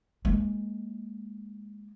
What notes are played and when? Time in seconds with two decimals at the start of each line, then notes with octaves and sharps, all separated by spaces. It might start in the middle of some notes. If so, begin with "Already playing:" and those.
0.25 G#3 A#3